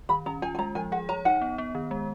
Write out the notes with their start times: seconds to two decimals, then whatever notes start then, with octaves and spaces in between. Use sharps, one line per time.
0.09 D#3 B5
0.26 C#4 A#5
0.42 F4 G#5
0.55 G#5
0.59 G#3 A#5
0.75 F3 G#5
0.92 G#4 F#5
1.09 C#5 A#5
1.25 D#4 F#5
1.42 B3
1.58 B3
1.75 D#3
1.91 G#3